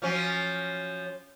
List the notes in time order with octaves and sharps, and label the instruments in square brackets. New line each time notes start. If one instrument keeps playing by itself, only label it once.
[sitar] F3 F#3 C#4